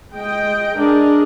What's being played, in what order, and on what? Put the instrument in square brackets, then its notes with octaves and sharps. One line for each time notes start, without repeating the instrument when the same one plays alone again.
[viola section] G#3 D#5 G5
[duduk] D4 [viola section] G#4 A#4 D#5